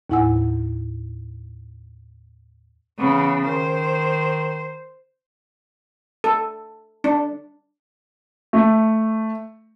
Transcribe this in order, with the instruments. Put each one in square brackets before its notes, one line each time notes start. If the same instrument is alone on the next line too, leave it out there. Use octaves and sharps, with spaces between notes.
[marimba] D#2 A2 E4 F#5 G#5 E6
[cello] C#3 E3 [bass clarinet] B3
[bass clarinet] D#3 [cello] C5
[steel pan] A4
D4
[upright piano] A3